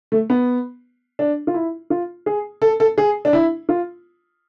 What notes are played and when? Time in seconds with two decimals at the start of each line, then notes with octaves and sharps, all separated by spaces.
0.12 A3
0.30 B3
1.19 D4
1.47 F4
1.54 E4
1.90 F4
2.26 G#4
2.62 A4
2.80 A4
2.98 G#4
3.25 D4
3.33 E4
3.69 F4